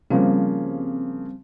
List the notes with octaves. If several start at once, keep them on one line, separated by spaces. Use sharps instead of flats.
C#3 F3 G3 A#3 C4